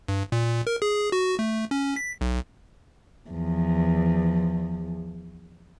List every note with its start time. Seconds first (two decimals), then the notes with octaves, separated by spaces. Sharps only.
0.08 G2
0.32 A#2
0.67 A#4
0.82 G#4
1.12 F#4
1.39 A3
1.71 C#4
1.96 B6
2.21 B1
3.30 E2 F3